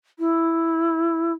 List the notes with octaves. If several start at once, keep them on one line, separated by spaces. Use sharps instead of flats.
E4